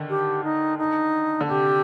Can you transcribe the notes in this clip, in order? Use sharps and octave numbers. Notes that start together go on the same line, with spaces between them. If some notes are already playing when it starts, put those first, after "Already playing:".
Already playing: D3 D#3
G4
D#4
D#4
D3
C3 G4